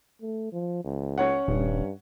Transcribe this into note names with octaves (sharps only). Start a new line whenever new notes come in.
A3
F3
C#2
C#4 C#5 F#5
D#1 G2